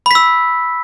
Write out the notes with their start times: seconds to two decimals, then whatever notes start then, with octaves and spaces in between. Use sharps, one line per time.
0.06 B5
0.11 B6
0.15 E6